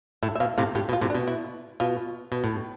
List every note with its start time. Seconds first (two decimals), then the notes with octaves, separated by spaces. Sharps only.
0.23 A2 E5
0.35 E5
0.40 B2 F5
0.58 A2 C3 F5
0.75 A2 G4
0.89 B2
0.93 F4
1.01 A2 C3
1.10 D4
1.15 B2
1.28 E4
1.80 B2 F4
2.32 B2
2.44 A2